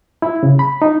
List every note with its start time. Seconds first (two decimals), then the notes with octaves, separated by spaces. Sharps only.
0.22 E4
0.43 C#3
0.59 B5
0.82 D#4